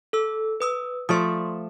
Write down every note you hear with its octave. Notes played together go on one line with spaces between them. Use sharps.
A4 E6
B4 D#6 E6
F3 A3 D5 C6 C#6 D#6